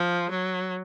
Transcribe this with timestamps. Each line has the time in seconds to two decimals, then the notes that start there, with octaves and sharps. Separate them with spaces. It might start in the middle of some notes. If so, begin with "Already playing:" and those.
Already playing: F3
0.31 F#3